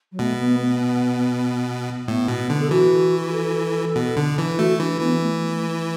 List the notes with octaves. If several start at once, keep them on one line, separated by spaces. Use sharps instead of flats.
F#3
B2 A3
B3
B3
A2 B3
B2
D3
A4
E3 F#4
F#4
A4
B2
D3
E3
E4
A3 F#4
E3 D4
E3 B3
A3